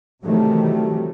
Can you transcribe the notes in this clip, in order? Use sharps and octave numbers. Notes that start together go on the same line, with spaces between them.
C3 D#3 E3 F#3 G3 A3